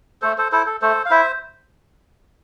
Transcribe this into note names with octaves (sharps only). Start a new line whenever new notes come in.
A3 A4 C5
A4 C5
E4 A4 C5
A4
A3 A4 C5
F5
E4 C5 E5